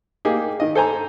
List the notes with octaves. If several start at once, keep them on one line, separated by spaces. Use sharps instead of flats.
A#3 D#4 G4 G#4
D#3 D#5
A4 C5 G#5 A#5